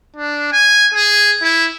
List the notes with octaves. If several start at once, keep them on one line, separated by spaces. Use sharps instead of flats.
D4
G#5
G#4
E4